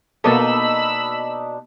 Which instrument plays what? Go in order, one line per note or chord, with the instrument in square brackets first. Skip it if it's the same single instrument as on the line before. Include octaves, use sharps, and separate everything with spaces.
[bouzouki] B2 D4 D#4 [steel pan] A#3 B3 A4 [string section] B5 E6